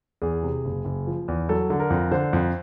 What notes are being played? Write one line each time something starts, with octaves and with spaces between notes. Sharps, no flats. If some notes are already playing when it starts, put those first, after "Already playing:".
E2 G#4
C3
F#1
F#1
F3
E2
F#3 A4
D3 A4
A#4
F2
D3 C5
F2